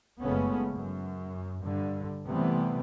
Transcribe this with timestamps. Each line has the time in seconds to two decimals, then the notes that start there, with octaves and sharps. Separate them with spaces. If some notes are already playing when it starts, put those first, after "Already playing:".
0.21 F#1 C#3 G#3 A3 B3 C#4
0.75 F#2
1.63 G2 D3
2.28 C3 E3 G3 A3 B3 C4